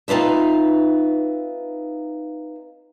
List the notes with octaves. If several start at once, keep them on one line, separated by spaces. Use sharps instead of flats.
C4 D#4 F4 B4 E5